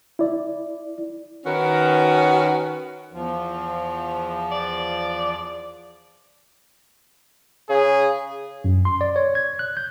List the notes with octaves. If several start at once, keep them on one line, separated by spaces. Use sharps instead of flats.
E4 D5
D#3 C#4 F#4 A#4 B4
E2 F3
D5
C#3 G#4
F#2
C6
D5
C#5
G#6
F#6
G6